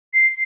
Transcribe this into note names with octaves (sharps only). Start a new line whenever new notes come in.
C7